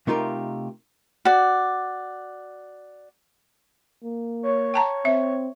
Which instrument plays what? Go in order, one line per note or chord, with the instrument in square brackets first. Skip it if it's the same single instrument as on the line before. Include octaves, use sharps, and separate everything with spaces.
[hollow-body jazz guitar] C3 A3 D#4 F4 G4 A#4
[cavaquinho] F#4 D5
[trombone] A#3
[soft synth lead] C#5
[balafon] G5 A5 A#5
[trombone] C4 [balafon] E5